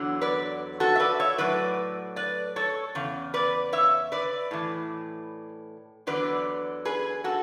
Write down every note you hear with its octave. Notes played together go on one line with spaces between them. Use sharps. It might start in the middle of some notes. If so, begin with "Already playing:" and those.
Already playing: E2 D3 F#3
B4 D5
F#4 A4
E5
B4 D5
C#5 E5
A2 F#3 B4 D5
B4 D5
A4 C#5
E2 C#3
B4 D5
C#5 E5
B4 D5
A2 E3
E2 D3 F#3 B4 D5
G#4 B4
F#4 A4